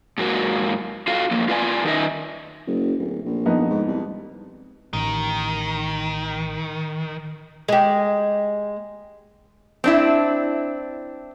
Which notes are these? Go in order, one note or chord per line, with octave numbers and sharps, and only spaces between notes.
G#2 F#3 A#3 F#4
F4 F#4 A4 F5
F3 F#3 A#3
F4 B4 D5 E5 G#5
D#3 D#4 G4 A#4 D#5 E5
F#1
D1
A#1
F2 B3 D#4
G#2
C2
A1 D#3
G#3 G4
C4 D4 E4